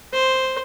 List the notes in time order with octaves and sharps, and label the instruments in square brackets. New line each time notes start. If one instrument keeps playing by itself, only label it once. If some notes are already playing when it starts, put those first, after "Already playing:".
[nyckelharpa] C5